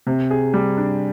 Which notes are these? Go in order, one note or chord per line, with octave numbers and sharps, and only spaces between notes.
C3
G#4
G3
D4